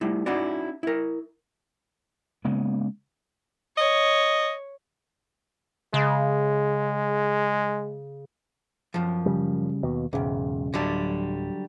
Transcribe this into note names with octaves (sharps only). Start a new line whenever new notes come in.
G3 A3 E4
C#4 D#4 E4 F#4 D5
E4 A#4
C#3 G#3 A#3 B3
C#5 D#5
C#3 G#3
F#2 F3
C#3 G3
D#2 B2
E1 B1 G#2 C#3
D1 D3 F#3 G3